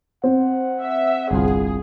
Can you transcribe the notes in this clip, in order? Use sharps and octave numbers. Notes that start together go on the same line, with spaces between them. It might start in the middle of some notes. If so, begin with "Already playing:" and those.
C4 F#5
E5
G1 C2 F4 G#4